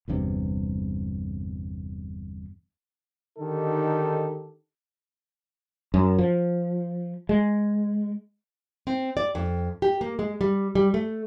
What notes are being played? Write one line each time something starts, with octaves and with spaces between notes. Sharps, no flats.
G1 E2 G2 C3
D3 D#3 D#4 G4 A4
F#2
F3
G#3
C4
D5
F2
G4
A#3
G#3
G3
G3
A3